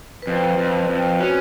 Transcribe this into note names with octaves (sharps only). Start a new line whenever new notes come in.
B4
F2 C5
F2
F2
C#4 F#4